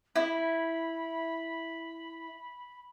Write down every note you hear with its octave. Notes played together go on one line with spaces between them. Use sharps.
E4 B5